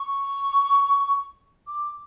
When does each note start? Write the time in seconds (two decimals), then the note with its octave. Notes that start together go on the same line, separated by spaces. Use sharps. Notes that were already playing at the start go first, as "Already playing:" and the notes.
Already playing: C#6
1.67 D6